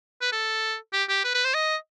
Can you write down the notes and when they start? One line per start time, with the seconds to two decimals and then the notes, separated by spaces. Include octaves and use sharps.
0.22 B4
0.32 A4
0.93 G4
1.09 G4
1.24 B4
1.34 B4
1.45 C5
1.55 D#5